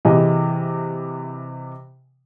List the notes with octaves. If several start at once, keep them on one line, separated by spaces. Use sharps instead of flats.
C3 E3 G#4 D#5